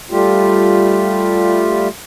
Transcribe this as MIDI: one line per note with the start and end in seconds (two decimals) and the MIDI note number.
0.11 1.88 55
0.11 1.88 57
0.11 1.88 65
0.11 1.88 67